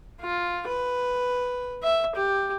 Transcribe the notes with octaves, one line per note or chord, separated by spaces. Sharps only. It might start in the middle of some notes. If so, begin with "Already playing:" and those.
F4
B4
E5
G4